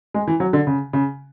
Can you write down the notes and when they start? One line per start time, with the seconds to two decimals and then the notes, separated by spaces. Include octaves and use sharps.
0.14 G#3
0.27 E3
0.40 F#3
0.53 D3
0.67 C#3
0.93 C#3